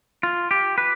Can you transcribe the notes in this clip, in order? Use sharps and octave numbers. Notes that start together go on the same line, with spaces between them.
F4
G4
B4